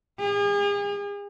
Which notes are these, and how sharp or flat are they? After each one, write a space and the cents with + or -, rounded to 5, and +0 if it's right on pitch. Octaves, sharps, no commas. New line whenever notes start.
G#4 -40